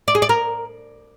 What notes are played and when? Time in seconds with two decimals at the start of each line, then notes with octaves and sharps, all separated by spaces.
0.08 D5
0.15 G#4
0.22 D5
0.29 A#4